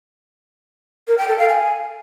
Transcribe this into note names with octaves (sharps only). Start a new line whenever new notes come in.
A#4
G5
A4
F5
G#5